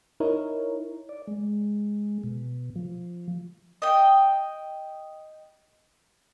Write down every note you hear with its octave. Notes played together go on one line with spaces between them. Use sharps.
D#4 E4 A#4 C#5
D5
G#3
B2
F3
D#5 G5